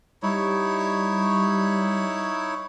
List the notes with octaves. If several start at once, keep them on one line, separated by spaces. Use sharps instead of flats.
G3 D#4 E4 C#5